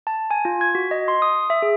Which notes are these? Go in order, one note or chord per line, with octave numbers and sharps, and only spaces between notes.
A5
G#5
F4
G#6
F#4
D#5
C6
D#6
E5
G#4